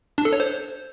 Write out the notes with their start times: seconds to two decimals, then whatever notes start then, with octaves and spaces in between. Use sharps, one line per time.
0.18 D4
0.25 A4
0.33 C#5
0.40 C5